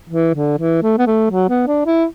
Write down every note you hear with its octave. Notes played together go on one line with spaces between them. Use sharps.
E3
D3
E3
A3
B3
A3
F#3
B3
D4
E4